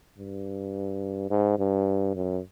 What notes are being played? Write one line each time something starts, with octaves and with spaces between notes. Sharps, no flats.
G2
G#2
G2
F#2